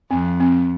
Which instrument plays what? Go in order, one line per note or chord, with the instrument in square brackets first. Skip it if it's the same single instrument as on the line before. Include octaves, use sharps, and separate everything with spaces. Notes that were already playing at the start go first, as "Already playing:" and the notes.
[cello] F2 [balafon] C4
[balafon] C4